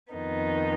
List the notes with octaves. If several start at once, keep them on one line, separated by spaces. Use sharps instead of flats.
F2 D#3 B3 D#4